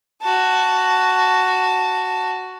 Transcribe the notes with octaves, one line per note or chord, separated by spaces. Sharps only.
F#4 A5